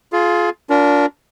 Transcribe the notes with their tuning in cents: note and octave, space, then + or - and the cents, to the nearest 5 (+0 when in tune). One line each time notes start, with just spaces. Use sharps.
F4 +0 G#4 +35
D4 -30 F4 +30 A#4 +0